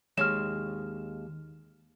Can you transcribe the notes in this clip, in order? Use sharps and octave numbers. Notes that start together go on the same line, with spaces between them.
D#2 G#3 C#5 F6 E7